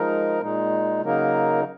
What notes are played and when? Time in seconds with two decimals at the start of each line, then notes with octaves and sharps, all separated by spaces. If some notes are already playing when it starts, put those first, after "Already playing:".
Already playing: F3 G#3 D#4 A#4
0.40 A#2 G#3 D#4
1.03 C#3 F#3 A#3 D#4 A#4